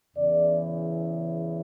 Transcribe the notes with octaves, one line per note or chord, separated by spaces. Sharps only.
E2 C#3 E3 D5